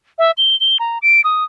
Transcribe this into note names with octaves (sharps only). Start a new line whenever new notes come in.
E5
G7
G7
A#5
D7
D#6